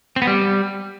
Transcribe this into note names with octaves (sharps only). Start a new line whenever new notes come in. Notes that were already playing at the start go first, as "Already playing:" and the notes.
C4
B3
G3